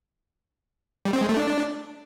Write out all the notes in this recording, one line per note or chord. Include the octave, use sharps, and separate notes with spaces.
G3
C4
G#3
A3
D4